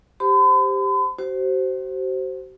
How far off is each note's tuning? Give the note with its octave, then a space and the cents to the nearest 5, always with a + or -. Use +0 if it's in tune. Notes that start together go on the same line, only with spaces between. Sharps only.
G4 +0 C5 +0 B5 +45
F#4 +45 C5 +0